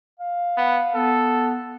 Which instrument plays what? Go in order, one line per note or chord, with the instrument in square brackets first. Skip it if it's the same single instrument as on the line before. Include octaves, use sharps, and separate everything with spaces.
[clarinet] F5
[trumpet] B3
[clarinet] B3 [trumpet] A4